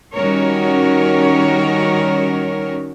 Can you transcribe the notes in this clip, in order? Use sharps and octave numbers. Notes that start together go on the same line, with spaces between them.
D#3 G3 C#4 F#4 A#4 C#5